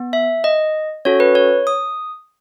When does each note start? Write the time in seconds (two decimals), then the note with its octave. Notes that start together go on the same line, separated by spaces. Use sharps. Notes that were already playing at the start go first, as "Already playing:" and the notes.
Already playing: B3
0.13 E5
0.44 D#5
1.05 C#4 F#4 A4 C#5
1.20 B4
1.35 C#5
1.67 D#6